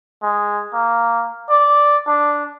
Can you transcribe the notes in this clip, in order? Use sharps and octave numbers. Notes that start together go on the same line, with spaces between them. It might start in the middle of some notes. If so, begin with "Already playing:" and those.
G#3
A#3
D5
D4